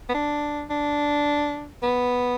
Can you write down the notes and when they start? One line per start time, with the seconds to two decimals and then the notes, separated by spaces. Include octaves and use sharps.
0.09 B3
0.14 D4
0.70 D4
1.83 B3